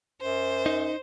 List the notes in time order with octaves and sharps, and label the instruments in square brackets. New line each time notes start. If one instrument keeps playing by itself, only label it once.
[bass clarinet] F#2 [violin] C5
[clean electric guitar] D#4